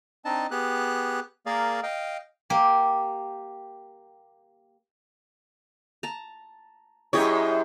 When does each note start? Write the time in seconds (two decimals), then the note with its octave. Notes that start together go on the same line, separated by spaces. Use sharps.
0.25 C4 D4 D#4 D#5 A5
0.51 B3 G4 G#4 F#6
1.46 A#3 G#4 A#4 D5 F5
1.83 D#5 F5 G5
2.50 A#3 G4
6.03 A5 A#5
7.13 F#2 E4 G4 G#4 C#5 D#5